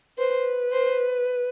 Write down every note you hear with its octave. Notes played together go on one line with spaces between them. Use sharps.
B4 C5
C5